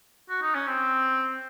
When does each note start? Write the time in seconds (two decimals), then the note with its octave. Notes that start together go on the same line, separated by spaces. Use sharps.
0.29 F#4
0.42 D#4
0.55 C#4
0.67 C4